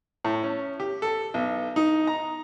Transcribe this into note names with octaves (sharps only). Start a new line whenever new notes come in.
A2
C#4
G4
A4
B1
D#4
A#5